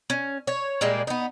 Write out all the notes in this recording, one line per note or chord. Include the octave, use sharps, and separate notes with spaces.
C#4
C#5
A#2 G3 G#3 A#3
B3 D#4